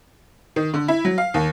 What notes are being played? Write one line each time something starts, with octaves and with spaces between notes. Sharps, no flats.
D#3
D3
E4
F#3
F5
D#2